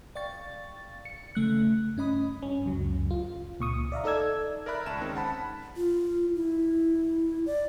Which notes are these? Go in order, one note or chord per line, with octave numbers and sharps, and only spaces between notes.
D5 F5 G5 C#6 A6
C#7
C#3 A3 F#6
G2 C#4 D#5 B5 D#6
G2 C#4
C#2 F#2 F#3
F4
C#2 A#2 C#6 D#6
D5 E5 F5 A#5
D#4 A4 D5 E6 G#6
A#4 D5 E5 B5 F#6
C#2 A5 E7
D#3 G#3 C4 C#4 D#4
F#5 A5 B5
F4
E4
D5